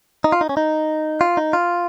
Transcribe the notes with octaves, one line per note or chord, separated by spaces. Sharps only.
D#4
F4
D#4
C#4
D#4
F4
D#4
F4